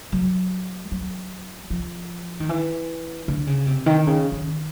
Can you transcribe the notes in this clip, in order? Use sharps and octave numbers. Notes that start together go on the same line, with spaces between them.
F#3
F#3
F3
D#3
E3
D3
C#3
C3
D#3
C#3
D#3